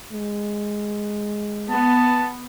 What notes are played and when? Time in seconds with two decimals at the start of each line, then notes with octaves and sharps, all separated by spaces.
0.12 G#3
1.70 B3 A5